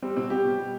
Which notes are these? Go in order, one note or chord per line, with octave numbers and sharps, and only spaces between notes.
G3 C4
B2 C4
G3 G4
B2
G3